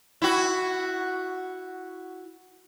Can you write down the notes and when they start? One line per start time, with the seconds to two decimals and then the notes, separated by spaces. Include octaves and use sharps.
0.22 E4 F#4